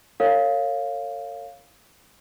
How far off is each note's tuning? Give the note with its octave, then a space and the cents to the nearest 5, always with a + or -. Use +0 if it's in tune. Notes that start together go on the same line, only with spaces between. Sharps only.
A#4 -45 C#5 +0 F5 +0